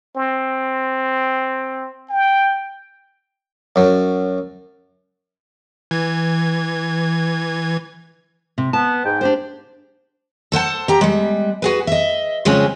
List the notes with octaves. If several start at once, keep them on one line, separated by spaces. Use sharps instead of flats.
C4
G5
F#2 F#3
E3 G#6
C3
B3 A5
G#2 G5
D4 G4 C5
A4 C5 F#5 A5
G4 A#5
G3 G#3
F#4 G#4 B4
D#5 E5
C#3 F3 G#3 C4 C#4 G#4